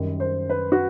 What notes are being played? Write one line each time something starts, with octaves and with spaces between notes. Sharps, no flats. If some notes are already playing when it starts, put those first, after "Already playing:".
Already playing: F#2 D#3 G3
C5
B4
F#4